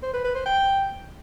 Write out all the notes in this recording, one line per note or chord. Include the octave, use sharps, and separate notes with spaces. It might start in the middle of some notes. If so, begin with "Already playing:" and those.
C5
B4
B4
C5
G5